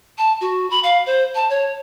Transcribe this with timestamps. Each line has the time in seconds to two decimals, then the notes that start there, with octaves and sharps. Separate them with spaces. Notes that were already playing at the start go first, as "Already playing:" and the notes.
0.18 A5
0.41 F#4
0.70 B5
0.83 F5
1.06 C5
1.35 A5
1.50 C#5